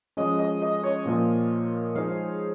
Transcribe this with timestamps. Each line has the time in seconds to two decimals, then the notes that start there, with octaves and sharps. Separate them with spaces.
0.17 F3 G#3 C#4 D#5
0.39 D#5
0.62 D#5
0.83 C#5
1.05 A#2 F3 A#3 F4 A#4
1.95 F3 G#3 D#4 G#4 C5 F5